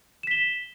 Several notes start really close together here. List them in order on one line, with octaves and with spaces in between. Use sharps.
E7 B6 G7